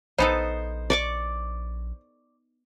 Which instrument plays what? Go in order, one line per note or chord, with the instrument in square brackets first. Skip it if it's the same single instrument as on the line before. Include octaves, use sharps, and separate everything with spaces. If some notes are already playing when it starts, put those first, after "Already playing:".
[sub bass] A#1 [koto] B3 D#4 A4 [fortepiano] C5
[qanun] D5 C#6 D6